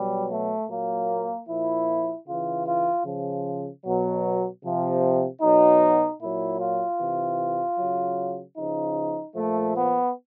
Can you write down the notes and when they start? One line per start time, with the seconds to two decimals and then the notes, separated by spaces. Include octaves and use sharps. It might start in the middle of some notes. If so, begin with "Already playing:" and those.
Already playing: B2 F#3 G3
0.30 A3
0.69 A#2 F#3 A#3
1.48 A#2 F3 E4
2.27 C#3 E3 F4
2.66 F4
3.05 C#3 F3
3.85 B2 F#3
4.64 C3 F3
5.42 B2 F#3 D#4
6.20 A#2 F#3 E4
6.60 F4
6.99 C3 E3
7.78 C#3 F#3
8.57 C#3 F3 D#4
9.36 A#2 F3 A3
9.76 B3